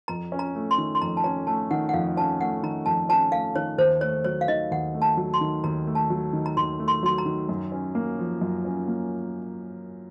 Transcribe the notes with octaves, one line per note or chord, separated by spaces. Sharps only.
F2 A#5
C#4
A#5
A3
C6
D#3
C6
F2 A#5
A5
C#4 A#5
A3 A5
D#3 F#5
F#5
F2 F5
C#4 A5
A3 F#5
D#3 A#5
F2 A5
C#4 A5
A3 F5
D#3 C#5
D#2 C5
A3 C#5
F#3 C#5
F5
D#3 D#5
D#2 F#5
A3
A5
F#3
C6
D#3
D#2 A#5
A3
A5
F#3
D#3
A#5
D#2 C6
A3
C6
F#3 C6
A#5
D#3
F#2
C#4
A#3
F3
F#2
C#4
A#3